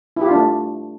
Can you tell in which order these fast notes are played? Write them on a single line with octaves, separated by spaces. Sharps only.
E4 G4 F4 D4 A3